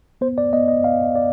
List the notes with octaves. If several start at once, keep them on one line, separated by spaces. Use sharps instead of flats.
B3 C5
D5
B3 D#5
D#5
B3 F5
D5